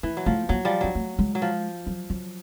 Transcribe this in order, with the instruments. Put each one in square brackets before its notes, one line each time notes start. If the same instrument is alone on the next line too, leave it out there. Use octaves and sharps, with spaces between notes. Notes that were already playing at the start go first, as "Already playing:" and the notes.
[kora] E3 [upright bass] A3
[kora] F#3
[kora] F3 [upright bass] A3
[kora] F#3 [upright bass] A#3
[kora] F3 G3
[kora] F#3 [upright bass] D4
[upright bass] A3
G#3
[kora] F#3
F3
[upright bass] F#3
F#3